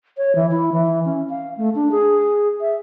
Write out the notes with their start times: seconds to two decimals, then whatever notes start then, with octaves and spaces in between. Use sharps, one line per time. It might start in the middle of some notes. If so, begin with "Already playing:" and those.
0.17 C#5
0.35 E3
0.51 E4
0.72 E3
1.05 C#4
1.29 F5
1.57 A3
1.75 D4
1.91 G#4
2.61 E5